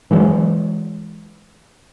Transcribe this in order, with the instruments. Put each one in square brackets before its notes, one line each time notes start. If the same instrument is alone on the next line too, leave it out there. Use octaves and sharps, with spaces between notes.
[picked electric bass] E3 F#3 G#3